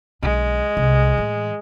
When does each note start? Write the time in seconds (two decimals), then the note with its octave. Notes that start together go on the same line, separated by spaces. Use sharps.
0.23 B1 D3 G#3
0.77 C2
1.17 A2 E3